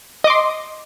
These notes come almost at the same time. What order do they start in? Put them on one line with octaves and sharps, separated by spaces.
D#5 D6 C6